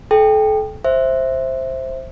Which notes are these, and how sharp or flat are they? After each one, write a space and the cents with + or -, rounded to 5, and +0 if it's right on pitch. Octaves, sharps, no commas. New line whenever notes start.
A4 -35 G5 +10
C5 +10 E5 +0